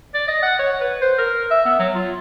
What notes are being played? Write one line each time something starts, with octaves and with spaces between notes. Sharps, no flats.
D5
D#5
F#5
C#5
B4
C5
A#4
E5
B3
F#3
F4